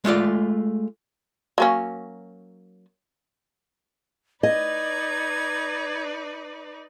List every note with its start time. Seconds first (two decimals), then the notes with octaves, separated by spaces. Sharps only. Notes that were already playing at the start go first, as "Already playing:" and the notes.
0.05 G#3 A3 F4 D5
1.58 F#3 A#3 C#4
4.43 D#4 B4 D5 D#5 G#6